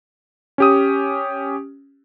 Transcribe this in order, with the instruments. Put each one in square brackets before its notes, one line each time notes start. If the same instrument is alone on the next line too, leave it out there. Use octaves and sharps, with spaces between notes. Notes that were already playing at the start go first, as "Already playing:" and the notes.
[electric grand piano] C#4 G4 D#6